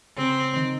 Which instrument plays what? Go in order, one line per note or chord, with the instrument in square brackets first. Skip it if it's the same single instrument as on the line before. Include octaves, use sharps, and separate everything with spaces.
[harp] C#3 [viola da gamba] C4
[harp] D#3